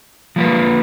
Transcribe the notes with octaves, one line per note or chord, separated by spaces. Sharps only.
F3 A#3 F4 B4